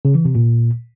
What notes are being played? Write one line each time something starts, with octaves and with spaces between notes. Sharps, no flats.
C#3
E3
C3
A#2